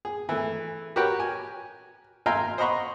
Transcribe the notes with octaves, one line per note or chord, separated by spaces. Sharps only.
G#4
E3 A3
F#4 G4 A#4 B4 C#5 G5
G#5
E5 F5 G5 G#5 A#5 C6
C5 D#5 F#5 A#5 B5 C#6